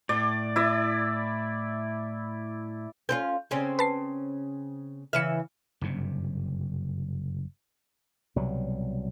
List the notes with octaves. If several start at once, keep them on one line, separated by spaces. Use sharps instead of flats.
A2 D5
E4 D5
C4 C#4 F4 G6
C#3 C4 C#4
B4 A5 C7
C#3 E3 E5 F6 C#7
F#1 G2 C3
C2 B2 F#3 G3